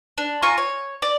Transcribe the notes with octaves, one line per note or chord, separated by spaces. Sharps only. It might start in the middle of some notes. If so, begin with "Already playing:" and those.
D4
F4 G#5 A#5 C#6
C#5
D5